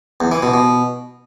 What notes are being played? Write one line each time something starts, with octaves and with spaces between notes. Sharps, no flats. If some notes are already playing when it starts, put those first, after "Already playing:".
E2
E3
B2
B2